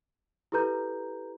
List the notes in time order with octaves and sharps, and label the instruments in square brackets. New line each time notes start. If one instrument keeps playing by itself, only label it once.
[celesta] E4 G4 A4 B4 A#5 G6